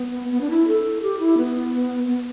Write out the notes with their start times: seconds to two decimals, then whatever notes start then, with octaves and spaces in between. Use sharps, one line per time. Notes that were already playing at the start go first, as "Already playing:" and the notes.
Already playing: B3
0.31 B3
0.41 D4
0.50 E4
0.68 A4
1.03 G4
1.19 E4
1.38 B3
2.07 B3